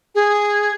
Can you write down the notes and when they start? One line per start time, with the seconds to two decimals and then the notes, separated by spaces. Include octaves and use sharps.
0.15 G#4